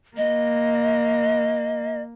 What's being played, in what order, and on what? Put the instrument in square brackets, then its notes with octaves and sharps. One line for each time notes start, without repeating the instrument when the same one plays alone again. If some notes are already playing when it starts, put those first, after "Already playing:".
[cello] A#3 [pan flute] D#5